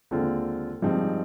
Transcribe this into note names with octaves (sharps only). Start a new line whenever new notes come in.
D#2 D3 G#3 C4 F4
G2 F3 G#3 C4 D#4